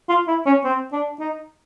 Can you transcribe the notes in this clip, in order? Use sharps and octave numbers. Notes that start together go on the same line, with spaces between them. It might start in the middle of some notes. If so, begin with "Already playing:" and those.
F4
E4
C#4
C4
D4
D#4